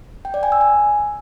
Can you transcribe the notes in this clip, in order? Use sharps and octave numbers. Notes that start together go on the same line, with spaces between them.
G5
D5
G#5
E6
G#5